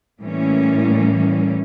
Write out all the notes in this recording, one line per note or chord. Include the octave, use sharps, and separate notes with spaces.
A2 E3 G3 A#3 C#4